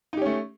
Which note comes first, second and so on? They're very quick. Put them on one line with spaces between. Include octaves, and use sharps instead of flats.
D#4 G4 C#4 A3